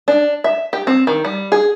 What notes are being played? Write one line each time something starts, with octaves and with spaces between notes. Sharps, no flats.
D4
E5
G4
C4
D#3
G3
G#4